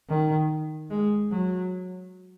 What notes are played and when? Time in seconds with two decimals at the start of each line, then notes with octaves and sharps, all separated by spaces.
0.09 D#3
0.90 G#3
1.31 F#3